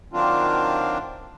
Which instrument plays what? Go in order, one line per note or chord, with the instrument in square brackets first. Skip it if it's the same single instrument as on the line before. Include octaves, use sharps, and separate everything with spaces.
[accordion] D#3 F#3 C4 D4 F4